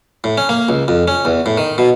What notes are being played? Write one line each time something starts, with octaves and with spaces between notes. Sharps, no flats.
A2
C#4
A#3
C#2
F2
C#4
E2
A2
D#3
B2